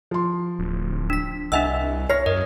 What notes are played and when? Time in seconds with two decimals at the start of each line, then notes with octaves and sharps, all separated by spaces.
0.11 F3 C6
0.59 D1
1.10 D4 B6
1.52 C2 D4 D#5 E5 F#5 G#5 E6
2.10 C#5 F6 A#6 C7
2.26 F#2 A#4 D#5